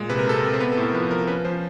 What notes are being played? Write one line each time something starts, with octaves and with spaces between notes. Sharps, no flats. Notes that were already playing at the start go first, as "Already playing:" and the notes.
Already playing: A#2 G#3
C3 B4
A#4
C3 A4
A#4
C3
C5
B3 B4
A4
A2
A#4
F3 B4
F3 A#4
C#4 B4
F3 C5